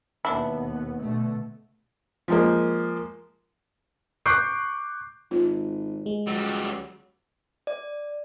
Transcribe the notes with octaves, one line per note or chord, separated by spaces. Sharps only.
D#2 B2 B3 D4 E4
B2 D3 A3
F3 G#3 A#3
C#6 D6 F#6 G6 C7 D7
G#1 F4
G#3
C#2 F#3 G3
D5